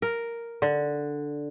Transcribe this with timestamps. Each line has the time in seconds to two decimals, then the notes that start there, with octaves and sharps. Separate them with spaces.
0.02 A#4
0.62 D3